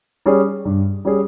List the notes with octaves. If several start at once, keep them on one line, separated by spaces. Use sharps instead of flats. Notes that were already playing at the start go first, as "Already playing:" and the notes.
G3 C#4 G#4
G2
G3 C#4 G#4